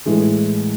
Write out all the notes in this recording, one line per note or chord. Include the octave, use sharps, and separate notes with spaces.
A2 E3 G#3